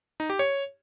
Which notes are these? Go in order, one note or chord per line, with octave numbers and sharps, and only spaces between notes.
D#4
G4
C#5